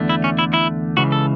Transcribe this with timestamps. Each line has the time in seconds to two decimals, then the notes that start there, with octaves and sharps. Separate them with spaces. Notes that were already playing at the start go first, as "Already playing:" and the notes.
Already playing: E2 D3 A3
0.09 E4
0.24 C#4
0.39 E4
0.54 E4
0.97 C#2 C#3 E3 F#4
1.12 A4